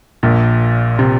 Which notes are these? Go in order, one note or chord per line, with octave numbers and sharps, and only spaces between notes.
A#1 A#2
C3